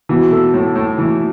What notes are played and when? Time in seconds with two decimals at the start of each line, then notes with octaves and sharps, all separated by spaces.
0.09 B2 E3
0.32 A3
0.54 A2
0.75 A2
0.98 E3